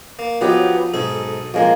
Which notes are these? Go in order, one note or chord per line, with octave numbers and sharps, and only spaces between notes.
A#3
F3 F#3 B3 D#4 G4
B1 G#2 G#4 A4
F2 F3 G#3 A#3